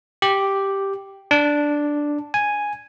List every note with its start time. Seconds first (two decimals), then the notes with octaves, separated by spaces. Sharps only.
0.22 G4
1.31 D4
2.34 G#5